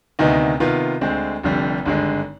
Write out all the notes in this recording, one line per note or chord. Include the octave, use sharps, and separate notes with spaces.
D2 C3 D#3 B3 D#4
C3 D#3 B3 F4
D2 D3 G#3 C4
F1 F2 D3 G3
G#1 G2 D3 G#3